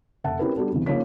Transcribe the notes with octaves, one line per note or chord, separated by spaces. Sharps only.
F1 E5 F#5 A5
C4 C#4 E4 G4 A#4 B4
G3 B3 D4 F#4 A4
E2 C3 E3
C#3 F3 A#3 D#4 C#5 B6